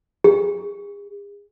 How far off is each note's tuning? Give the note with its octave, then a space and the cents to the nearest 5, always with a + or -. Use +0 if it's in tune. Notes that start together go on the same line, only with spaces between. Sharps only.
G#4 -40